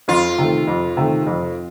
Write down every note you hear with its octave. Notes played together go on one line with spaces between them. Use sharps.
F2 F4
C3 D#3 A3
F2
C3 D#3 A3
F2